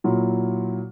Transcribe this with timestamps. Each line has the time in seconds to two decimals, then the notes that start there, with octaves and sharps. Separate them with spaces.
0.04 A#2 F#3 E4